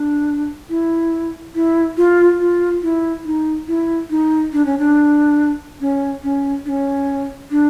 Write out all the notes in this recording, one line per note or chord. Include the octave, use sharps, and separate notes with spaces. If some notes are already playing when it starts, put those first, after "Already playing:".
Already playing: D4
E4
E4
F4
F4
E4
D#4
E4
D#4
D4
C#4
D4
C#4
C#4
D4
C#4
D4